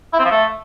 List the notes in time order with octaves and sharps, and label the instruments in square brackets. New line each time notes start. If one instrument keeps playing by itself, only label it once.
[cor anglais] E4
C4
F3
A3